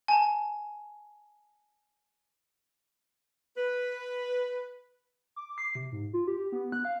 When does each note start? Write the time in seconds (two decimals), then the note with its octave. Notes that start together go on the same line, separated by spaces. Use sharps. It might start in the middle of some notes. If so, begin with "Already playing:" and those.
0.08 G#5 A5
3.57 B4
5.36 D6
5.58 C7
5.75 C3
5.92 G#2
6.13 F4
6.27 G4
6.52 B3
6.72 F#6
6.85 F5